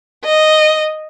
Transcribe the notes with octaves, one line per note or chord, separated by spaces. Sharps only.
D#5